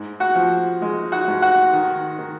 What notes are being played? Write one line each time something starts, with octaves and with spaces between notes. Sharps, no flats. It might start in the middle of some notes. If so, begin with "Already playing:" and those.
Already playing: G#2
F#4 F#5
F3
G#3
F#4 F#5
G#2
F#4 F#5
D#3
D#3